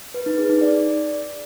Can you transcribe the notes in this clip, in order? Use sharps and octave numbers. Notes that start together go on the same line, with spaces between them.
B4
D#4
G#4
D#4
D5